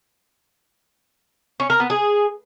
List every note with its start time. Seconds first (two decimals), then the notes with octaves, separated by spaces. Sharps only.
1.60 C#4
1.70 A#4
1.80 B3
1.90 G#4